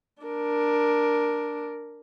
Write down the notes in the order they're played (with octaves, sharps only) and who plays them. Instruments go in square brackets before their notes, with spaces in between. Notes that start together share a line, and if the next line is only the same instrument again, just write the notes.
[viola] D4 A#4